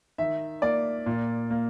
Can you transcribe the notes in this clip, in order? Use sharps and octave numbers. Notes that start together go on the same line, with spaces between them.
D#3 E5
A#3 D5
A#2
A#3